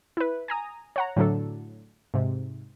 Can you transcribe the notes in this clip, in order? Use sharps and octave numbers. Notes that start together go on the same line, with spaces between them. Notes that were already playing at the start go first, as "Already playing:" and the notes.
E4 B4
G#5 A#5 D#6
C#5 F#5 A#5
A2 D3 F#3 A3 D4 A4
G#2 C3